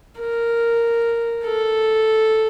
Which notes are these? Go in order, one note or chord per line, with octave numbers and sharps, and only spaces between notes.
A#4
A4